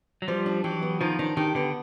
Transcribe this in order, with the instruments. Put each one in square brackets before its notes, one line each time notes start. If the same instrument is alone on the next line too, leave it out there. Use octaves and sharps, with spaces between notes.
[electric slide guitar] F#3
[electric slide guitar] F3 G3 [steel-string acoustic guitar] C5
[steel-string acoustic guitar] D4
[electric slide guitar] E3 F#3 [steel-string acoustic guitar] G4
[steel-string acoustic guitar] B3
[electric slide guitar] D#3 F3 [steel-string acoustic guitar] C5
[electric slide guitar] D#3 [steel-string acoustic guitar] D4
[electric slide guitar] D#3 [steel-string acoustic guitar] G4
[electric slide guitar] D3 [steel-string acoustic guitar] B3